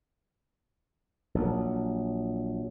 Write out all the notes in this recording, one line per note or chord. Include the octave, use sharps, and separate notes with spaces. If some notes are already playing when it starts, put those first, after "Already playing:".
A#1 F#3